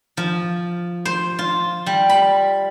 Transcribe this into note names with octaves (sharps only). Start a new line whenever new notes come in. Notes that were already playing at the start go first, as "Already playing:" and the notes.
F3
C5
F4
G3
B5